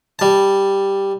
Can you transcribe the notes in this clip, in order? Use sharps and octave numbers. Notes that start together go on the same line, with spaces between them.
G3 A5